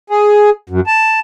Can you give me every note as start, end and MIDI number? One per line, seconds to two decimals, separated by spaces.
0.10 0.50 68
0.70 0.80 42
0.87 1.20 81